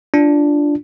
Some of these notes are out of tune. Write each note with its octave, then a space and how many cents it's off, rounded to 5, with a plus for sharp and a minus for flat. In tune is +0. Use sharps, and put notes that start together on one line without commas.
D4 -5 F4 -15